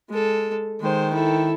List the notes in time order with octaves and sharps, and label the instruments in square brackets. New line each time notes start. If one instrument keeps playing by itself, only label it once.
[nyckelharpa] G#3 A4
[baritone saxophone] D#3 [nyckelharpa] G#3 C5
[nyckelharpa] E4 A4